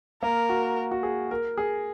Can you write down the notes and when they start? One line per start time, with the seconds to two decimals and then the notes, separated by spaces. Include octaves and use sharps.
0.22 A#3 A#4
0.49 F#4
0.91 F#4
1.03 G#4
1.31 A#4
1.57 G#4